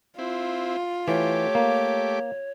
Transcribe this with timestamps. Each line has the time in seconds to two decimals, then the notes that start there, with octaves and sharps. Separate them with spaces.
0.19 C4 E4 F4
1.08 E3 A3 G4 C#5 D6
1.55 A#3